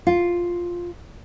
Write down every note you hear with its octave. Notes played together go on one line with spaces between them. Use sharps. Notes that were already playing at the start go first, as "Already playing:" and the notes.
F4